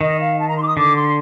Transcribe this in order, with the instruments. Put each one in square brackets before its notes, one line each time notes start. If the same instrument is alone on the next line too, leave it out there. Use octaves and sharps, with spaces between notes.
[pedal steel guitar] D#3 [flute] D#5
[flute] F5
A5
A#5
C6
D6
D#6
[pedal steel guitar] D3 [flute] D6
[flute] C6